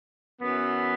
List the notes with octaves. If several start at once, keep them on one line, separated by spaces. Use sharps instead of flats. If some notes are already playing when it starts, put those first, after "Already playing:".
F#2 E3 B3